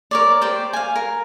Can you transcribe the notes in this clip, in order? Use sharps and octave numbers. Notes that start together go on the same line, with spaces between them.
A#4 C#5 D5
G4 C5 D5
F5 G#5
A#4